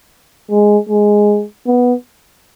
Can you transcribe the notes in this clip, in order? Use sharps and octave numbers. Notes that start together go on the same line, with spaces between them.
G#3
G#3
B3